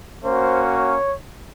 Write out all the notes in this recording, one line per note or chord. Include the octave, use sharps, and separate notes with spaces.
A#3 C#4 F#4 C5
C#5